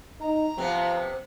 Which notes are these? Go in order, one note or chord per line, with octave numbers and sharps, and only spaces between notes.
D#4 A#5
C3 F3 B3 C4